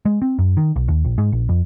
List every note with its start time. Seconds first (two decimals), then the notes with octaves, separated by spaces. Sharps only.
0.05 G#3
0.22 C4
0.39 F#2
0.57 D#3
0.76 B1
0.88 D#2
1.05 A#1
1.18 G#2
1.32 A#1
1.49 F2